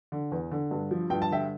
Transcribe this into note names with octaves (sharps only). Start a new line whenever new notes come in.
D3
E2
D3
G2
F3
G2 G5
A5
D3 E5 G5